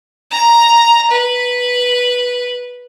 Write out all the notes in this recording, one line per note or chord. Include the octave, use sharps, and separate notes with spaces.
A#5
B4